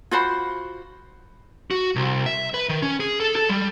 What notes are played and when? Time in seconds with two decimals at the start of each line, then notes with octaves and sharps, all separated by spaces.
0.11 F4 F#4 C5 B5
1.71 F#4
1.96 C2
2.26 E5
2.54 B4
2.69 D#3
2.83 C#4
3.00 G#4
3.20 A4
3.36 A4
3.49 G3